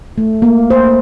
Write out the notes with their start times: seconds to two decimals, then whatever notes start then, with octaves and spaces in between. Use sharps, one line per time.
0.18 A3
0.42 A#3
0.70 C5